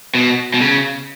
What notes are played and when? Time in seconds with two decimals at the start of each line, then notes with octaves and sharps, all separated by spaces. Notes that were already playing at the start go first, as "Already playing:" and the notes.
0.15 B2
0.54 B2
0.61 C#3